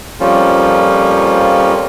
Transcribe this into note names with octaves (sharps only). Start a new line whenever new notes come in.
F2 F3 G3 A#3 C#4 F4